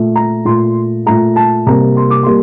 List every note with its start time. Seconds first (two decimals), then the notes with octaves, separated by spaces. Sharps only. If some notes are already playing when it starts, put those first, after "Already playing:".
Already playing: A#2 A3
0.16 A#5
0.45 A#2 A3 C6
1.06 A#2 A3 A#5
1.36 A5
1.66 C3 G3 A#3 A#5
1.97 C6
2.10 D6
2.23 G3 A#3 C6